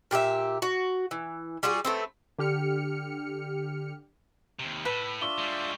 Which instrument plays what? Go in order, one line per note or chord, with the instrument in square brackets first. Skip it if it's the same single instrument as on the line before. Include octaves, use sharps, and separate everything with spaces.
[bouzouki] A#2 G4 G#4 E5
F#4
E3
G3 F4 F#4 G#4
A3 B3 C4
[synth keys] D3 G4 F6 C#7
[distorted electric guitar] D#2 C3
[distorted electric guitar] A2 [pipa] B4
[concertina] D4 F4 E5 [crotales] C#6 D6 G7
[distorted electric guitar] G3 G#3